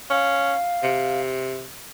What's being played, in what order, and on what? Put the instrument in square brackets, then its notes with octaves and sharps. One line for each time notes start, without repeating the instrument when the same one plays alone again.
[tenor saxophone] C#4 [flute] F5
[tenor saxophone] C3